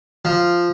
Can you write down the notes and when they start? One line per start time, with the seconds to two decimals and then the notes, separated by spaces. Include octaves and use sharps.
0.25 F3